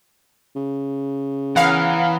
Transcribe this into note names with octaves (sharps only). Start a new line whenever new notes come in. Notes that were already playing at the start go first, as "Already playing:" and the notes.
C#3
E3 B3 C#4 A#4 F5 F#5